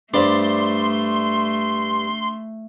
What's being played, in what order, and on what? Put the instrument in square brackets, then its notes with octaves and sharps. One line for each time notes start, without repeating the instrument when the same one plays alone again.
[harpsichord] G2 D5 [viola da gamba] A3 [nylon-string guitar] D4 C5 [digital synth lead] C6